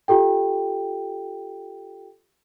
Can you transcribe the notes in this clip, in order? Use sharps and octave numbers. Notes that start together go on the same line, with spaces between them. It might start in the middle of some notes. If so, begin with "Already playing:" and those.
F4 G4 A4 G5